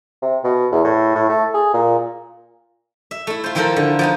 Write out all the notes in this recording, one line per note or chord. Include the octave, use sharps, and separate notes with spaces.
C3
B2
E2
A2
A2
A3
G#4
A#2
E5
A3 E4
F4 C5
D#3 F3 E4 F4 A4 A#4
D3
F3 B3 D#4